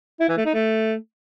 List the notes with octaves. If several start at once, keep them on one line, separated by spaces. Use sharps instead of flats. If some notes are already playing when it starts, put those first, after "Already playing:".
E4
E3
A3
D#4
A3